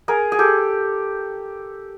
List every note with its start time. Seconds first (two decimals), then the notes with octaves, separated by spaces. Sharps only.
0.08 G#4 A#4
0.32 G#4
0.39 G4 A4